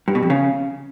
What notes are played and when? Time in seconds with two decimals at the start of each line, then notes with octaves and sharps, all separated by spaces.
0.08 G2
0.15 B2
0.22 F2
0.30 C#3